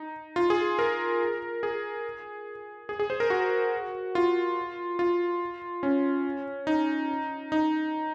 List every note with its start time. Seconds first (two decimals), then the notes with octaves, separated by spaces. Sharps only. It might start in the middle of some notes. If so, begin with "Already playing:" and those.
Already playing: D#4
0.36 F4
0.50 G#4
0.79 A#4
1.63 G#4
2.89 G#4
2.99 G#4
3.10 C5
3.20 A#4
3.30 F#4
4.15 F4
4.99 F4
5.83 C#4
6.67 D#4
7.52 D#4